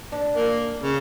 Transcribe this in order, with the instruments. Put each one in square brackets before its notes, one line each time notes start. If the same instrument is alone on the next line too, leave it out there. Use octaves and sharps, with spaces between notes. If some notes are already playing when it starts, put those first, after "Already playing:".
[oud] D4
[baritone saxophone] A#3
C#3